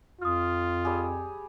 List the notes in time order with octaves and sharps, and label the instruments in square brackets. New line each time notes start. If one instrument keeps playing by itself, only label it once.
[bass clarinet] F2 [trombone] F4 [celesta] D#6 F6
[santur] G3 G4 G#4